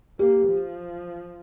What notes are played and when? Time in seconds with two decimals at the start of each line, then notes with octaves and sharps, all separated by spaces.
0.19 A#3 G4
0.47 F3